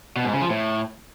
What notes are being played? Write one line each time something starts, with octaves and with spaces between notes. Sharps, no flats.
B2
G#2
C#3
F3
A2